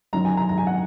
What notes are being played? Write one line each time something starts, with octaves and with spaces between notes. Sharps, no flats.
F#2 D#3 F#3 A#5
G#5
A#5
A#5
G#5
F#5